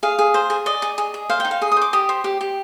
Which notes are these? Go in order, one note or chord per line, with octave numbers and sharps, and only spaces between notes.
G#4 F5
G#4
C5
G#4
D5 D#5
G#4
G#4
G#4
C5 F5
G5
D#4
F5
G#4 D#6
D#6
C5
D6
G4 D#6
C5
G4
G4